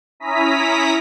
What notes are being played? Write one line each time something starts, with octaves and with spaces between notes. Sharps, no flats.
C#4 E4 A#5 D#6 B6